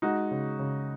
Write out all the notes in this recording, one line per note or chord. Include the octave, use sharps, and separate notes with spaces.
G#3 D#4 F#4
C#3
C#3